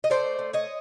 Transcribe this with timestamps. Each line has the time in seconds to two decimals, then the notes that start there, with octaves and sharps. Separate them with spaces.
0.04 D#5
0.10 A3 C5 D5
0.39 A3
0.53 C#5 D#5